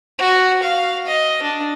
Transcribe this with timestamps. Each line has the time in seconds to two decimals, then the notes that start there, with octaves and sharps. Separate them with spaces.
0.18 F#4
0.63 F5
1.06 D#5
1.42 D4